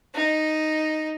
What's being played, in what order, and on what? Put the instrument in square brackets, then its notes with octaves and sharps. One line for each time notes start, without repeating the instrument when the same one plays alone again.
[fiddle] D#4